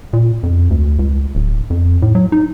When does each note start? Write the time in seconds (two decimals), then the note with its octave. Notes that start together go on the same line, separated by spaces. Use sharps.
0.13 A#2
0.43 F2
0.70 D2
0.99 C#2
1.35 D1
1.70 F2
2.02 A2
2.15 F#3
2.32 D#4